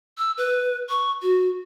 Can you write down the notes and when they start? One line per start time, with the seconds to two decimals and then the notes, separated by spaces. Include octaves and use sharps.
0.18 E6
0.38 B4
0.89 C#6
1.22 F#4